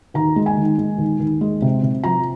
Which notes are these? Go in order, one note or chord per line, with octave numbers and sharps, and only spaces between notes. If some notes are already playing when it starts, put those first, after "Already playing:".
D#2 A#5
G#3
G#5
D#3
G#3
D#2
D#2
G#3
C3
C3
F3 A#5